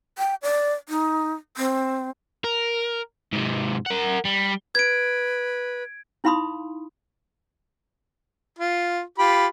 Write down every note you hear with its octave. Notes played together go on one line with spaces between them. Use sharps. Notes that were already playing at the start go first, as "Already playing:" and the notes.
G5
D5
D#4
C4
A#4
G#2 C3
A#4 F#5
G3
B4 G#6 D7
D#4 E4 F5 B5 C6 D#6
F4
F4 G4 B5